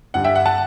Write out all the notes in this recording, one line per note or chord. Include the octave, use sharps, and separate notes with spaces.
G2 D3 F#5
E5 G5
F#5
F#5 A5